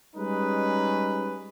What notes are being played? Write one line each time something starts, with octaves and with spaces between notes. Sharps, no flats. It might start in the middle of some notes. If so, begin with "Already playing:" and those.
G3 G#3 C#4 D#4 B4